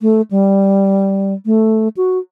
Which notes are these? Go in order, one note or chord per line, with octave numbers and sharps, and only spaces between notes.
A3
G3
A3
F#4